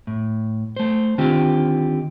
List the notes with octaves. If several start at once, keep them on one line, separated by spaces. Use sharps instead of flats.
A2
A3 C5
D3 D#3 C4 F4 G4